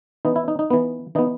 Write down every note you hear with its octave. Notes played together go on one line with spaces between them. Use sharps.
E3 B3 D#4
E4
D#4
D#4
E3 B3
E3 B3 D#4